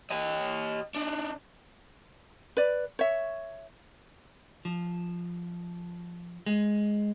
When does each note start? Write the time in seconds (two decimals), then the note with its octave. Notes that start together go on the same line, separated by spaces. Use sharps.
0.11 G4 D#5
0.95 D4 D#4
2.57 B4 D5
2.99 C#5 E5
4.65 F3
6.46 G#3